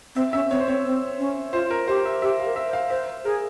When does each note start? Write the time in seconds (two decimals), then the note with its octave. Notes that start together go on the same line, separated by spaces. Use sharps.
0.15 C4 E5
0.33 C#4 E5
0.50 C4 C#5
0.60 C5
0.67 C4 C#5
0.85 C4
1.19 C#4
1.53 F4 C5
1.71 A#4
1.88 G4 C5
2.05 E5
2.22 G4 E5
2.39 F5
2.45 A#4
2.56 E5
2.68 C5
2.73 F5
2.90 C5 E5
3.25 G#4 A#4